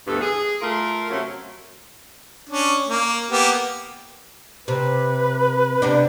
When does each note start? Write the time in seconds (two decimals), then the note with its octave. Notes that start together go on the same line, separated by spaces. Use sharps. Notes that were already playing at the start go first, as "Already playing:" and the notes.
0.07 D2 G2 E3 B3 A4
0.21 G#4
0.61 A3 F4 A#4
1.10 C3 F#3 A3 C#4
2.49 C#4 D4
2.88 A#3
3.31 A#3 B3 G4
4.68 C3 B4
5.82 C3 B3 D4